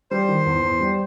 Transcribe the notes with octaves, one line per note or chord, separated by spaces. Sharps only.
G3 C5
D#3
E2
E2
G3